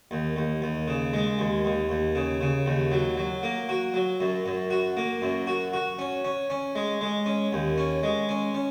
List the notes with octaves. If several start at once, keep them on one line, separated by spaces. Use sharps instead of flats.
D#2
D#2
D#2
C#3
G#3
D#2
D#2
D#2
C#3
C#3
D#2
F#3
F#3
A#3
F#4
F#3
F#2
F#2
F#4
A#3
F#2
F#4
F#4
C#4
C#4
C#4
G#3
G#3
C#4
D#2
C#4
G#3
C#4
C#4